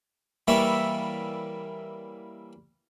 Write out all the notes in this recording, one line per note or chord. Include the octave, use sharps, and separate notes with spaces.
E3 G3 A#3 C#5 D5 E5